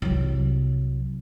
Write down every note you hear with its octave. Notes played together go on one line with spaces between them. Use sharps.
C2 F#3